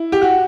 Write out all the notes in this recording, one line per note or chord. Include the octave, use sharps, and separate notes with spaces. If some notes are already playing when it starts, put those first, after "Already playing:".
Already playing: E4
G4
F#4